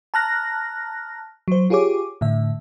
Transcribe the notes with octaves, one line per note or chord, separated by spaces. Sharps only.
A5 A#5 F6 F#6 A#6
F#3 C5
F4 G4 G#4 C#5 D6
A2 D3 E5